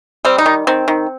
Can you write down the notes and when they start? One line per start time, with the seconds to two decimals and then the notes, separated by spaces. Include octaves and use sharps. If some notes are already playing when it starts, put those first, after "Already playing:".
0.25 G3 C4
0.38 D#4
0.46 D#3
0.67 D#3 C4
0.88 D#3